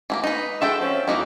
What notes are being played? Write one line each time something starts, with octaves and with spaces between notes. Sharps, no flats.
E3 A3 A#3
D#4 B4
G#3 F#4 A4 E5 G5
F3 C4 C#4
E2 A#3 D#4 E4 F#4